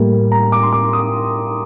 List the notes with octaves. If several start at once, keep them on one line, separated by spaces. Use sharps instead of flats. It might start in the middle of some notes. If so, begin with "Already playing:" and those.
Already playing: A2 G3 A#3
A#5
D6
C6
D6
D#6